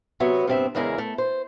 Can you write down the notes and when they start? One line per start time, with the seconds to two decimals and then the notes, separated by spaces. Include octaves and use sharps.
0.20 C3 F#3 B3 C#5 E5
0.47 G2 C3 B3 C4 A#4 E5
0.75 E2 C#3 G#3 E4 A#4
0.98 A3
1.18 C5